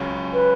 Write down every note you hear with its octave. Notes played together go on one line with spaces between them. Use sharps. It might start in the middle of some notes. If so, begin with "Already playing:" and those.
Already playing: C#2 C#3 F#3 C#4
B4